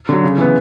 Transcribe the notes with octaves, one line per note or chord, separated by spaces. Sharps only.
D3 F#3
C#3
E3 B3